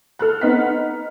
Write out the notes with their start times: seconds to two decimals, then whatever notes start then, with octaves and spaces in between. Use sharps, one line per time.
0.19 A4 F6 F#6
0.41 B3 C4 D#4 F#5 F6 B6
0.66 D#4